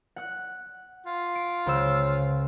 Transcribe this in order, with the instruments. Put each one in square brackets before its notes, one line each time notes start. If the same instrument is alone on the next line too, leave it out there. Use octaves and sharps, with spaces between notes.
[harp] F#5 F#6
[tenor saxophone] F4
[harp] D7
C#2 C5 E6